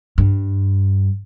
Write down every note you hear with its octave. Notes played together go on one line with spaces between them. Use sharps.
G2